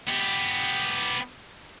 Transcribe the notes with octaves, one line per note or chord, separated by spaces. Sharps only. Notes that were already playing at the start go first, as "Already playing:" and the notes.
B3 G4